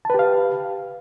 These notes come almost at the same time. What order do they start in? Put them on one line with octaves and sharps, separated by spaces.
A5 B4 G4 F5